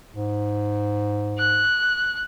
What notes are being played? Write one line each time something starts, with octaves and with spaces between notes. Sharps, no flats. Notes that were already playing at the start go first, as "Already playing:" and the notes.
G#2
F#6